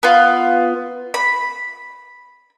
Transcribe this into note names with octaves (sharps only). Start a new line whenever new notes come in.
B3 F4
B5